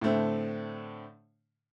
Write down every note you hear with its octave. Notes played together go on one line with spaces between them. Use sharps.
A2 D3 A3 C4